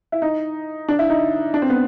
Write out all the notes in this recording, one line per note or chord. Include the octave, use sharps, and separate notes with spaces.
E4
D#4
D4
E4
D#4
D4
C4
B3